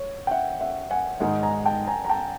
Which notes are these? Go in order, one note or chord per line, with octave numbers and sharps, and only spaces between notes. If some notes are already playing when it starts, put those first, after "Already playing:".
Already playing: C#5
G5
E5 F#5
E5 F#5
F#5 G#5
G#2 D#3 G#3 F#5 G#5
G#5 A#5
G5 A5
G#5 A#5
A#5
G5 A5